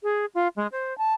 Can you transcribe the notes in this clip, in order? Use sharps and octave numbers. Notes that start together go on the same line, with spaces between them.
G#4
F4
G#3
C5
A5